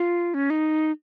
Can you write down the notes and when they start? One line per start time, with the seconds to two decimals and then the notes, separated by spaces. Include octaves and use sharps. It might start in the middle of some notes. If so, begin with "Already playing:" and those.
Already playing: F4
0.34 C#4
0.50 D#4